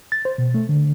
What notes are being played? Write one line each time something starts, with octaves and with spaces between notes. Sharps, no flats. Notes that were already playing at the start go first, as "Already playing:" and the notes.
A6
C5
B2
A3
D3